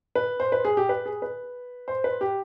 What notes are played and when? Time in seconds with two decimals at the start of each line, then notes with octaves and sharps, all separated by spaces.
0.15 B4
0.40 C5
0.52 B4
0.65 G#4
0.77 G4
0.89 B4
1.06 G#4
1.22 B4
1.88 C5
2.04 B4
2.21 G4